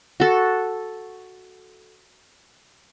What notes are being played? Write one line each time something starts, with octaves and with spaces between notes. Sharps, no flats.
F#4 A4